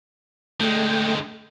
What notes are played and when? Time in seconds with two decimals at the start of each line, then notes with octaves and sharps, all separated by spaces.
0.61 D3 G#3 A3 G5